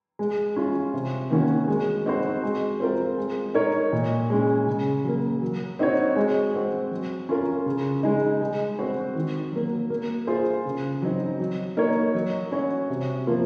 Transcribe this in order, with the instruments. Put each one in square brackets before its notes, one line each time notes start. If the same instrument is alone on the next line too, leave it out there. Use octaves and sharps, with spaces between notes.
[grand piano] G#3
C#4 F4
C3
D#3 A#3 C#4 F#4
G#3
C4 D#4 F#4 C5
G#3
C4 F4 A#4
G#3
D#4 A#4 C#5
A#2
G#3 C#4
C#3
F#3 A#3
F#3
C4 D#4 F#4 C#5
G#3
C4 F#4
F#3
C#4 F4 A#4
C#3
G#3 D#4
G#3
C4 F#4 C5
D#3
F#3 A#3
A#3
F4 G#4 C5
C#3
F#3 C4 D#4
F#3
A#3 D#4 A#4 C#5
F#3
C#4 F#4 C#5
C3
F3 A#3 F4